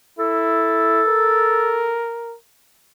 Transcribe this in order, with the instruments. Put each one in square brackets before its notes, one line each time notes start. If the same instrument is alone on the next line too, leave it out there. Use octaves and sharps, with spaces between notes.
[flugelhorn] E4 [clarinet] A4
[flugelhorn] A#4